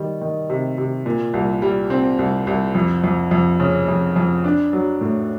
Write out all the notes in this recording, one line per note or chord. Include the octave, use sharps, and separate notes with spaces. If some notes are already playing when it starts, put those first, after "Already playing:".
Already playing: D#3 G3
D#3
C3
C3
A#2
C2
G3
C4
C2
C2
F2
F2
F2
C#3
F2
F2
D4
F#3
A2